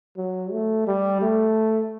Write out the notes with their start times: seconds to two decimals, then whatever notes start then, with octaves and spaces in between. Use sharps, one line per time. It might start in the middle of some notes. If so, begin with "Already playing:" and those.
0.17 F#3
0.52 A3
0.87 G3
1.21 A3